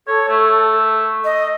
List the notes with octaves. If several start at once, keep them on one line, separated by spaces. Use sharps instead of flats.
A4 C#5
A3
D#5